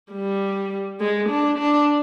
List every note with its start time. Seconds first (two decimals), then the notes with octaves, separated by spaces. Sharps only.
0.13 G3
1.00 G#3
1.30 D4
1.59 D4